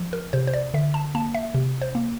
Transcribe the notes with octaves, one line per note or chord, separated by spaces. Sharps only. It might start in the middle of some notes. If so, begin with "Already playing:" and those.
Already playing: F3
A#4
C3 C5
C5
D5
D3 E5
A5
A#3 A5
E5
C3
C5
A#3